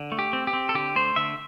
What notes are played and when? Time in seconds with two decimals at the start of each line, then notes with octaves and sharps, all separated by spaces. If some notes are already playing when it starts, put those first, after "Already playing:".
Already playing: D3
0.12 A3
0.19 G4
0.33 C4
0.47 G4
0.53 C4
0.69 A4
0.74 D3 G4
0.96 A3 C5
1.16 D3 E5